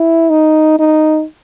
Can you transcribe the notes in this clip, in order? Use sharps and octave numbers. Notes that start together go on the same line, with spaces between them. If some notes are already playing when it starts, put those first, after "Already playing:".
Already playing: E4
D#4
D#4